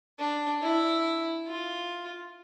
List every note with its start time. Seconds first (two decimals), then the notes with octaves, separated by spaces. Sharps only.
0.19 D4
0.62 E4
1.47 F4